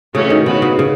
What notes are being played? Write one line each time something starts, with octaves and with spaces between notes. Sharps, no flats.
C#3 E3 A3 C#4 F#4
D#3
C#3 B3 F#4 B4
C#3
C#3